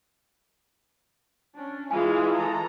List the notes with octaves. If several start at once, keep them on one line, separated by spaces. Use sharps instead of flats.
C#4 D4
E3 G#3 E4 F4 F5 G#5
A4 A#5